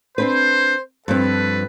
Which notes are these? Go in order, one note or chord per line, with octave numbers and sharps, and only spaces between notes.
C4 D4 B4 C5
G2 F3 C4 A4 B4